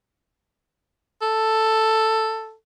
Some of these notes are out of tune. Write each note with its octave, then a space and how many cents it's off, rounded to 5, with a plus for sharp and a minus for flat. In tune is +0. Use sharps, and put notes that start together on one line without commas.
A4 +5